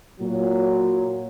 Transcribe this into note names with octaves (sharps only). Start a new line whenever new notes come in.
A#2 F#3